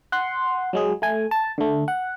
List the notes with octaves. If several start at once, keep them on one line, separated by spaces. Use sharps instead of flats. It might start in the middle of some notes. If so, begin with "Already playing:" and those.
F#5 C6
F#3 G#3 G#4
A3 G#5
A5
D3 A3
F#5